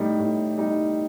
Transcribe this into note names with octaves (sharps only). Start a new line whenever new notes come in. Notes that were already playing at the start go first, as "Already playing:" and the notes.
Already playing: A2 G3 D#4
A2
G3 D#4